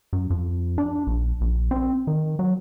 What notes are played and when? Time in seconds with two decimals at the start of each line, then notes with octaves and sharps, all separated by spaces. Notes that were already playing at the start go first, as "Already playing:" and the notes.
0.13 F#2
0.30 F2
0.78 D4
1.07 A#1
1.41 A#1
1.71 C4
2.07 D#3
2.39 F#3